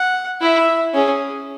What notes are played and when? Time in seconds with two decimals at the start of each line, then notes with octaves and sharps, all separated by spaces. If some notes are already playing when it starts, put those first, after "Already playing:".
Already playing: F#5
0.41 E4 E5
0.94 C#4 G#4